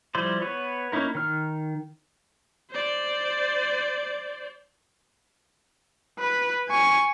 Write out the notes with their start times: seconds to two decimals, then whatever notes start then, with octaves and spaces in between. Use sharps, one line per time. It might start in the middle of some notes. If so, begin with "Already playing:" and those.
0.15 F3 G3 E4 C5 D5
0.42 B3 B4 C#5
0.92 A#3 C#4 D#4 E4 A#4
1.15 D#3 F6
2.70 C5 D5
6.19 B4
6.69 G#5 C#6